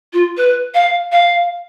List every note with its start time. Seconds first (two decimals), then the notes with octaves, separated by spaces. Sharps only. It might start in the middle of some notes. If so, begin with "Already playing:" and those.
0.13 F4
0.37 B4
0.74 F5
1.12 F5